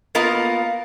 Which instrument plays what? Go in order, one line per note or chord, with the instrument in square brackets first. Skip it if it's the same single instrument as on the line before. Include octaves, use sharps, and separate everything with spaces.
[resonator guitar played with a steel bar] A#3 B3 F4 A#4 D#5